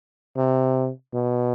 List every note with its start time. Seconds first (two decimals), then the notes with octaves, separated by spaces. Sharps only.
0.37 C3
1.14 B2